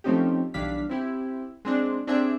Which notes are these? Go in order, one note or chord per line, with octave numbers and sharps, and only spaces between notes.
F3 A3 C4 C#4 D#4 G4
B1 E3 G3 D4 F5 B6
C4 E4 G4
G#3 C4 D4
C4 D4 G4 G#4 E5